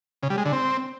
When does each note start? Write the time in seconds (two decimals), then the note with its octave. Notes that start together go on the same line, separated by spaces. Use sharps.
0.23 C#3
0.30 G3
0.38 G#3
0.45 D3
0.53 C4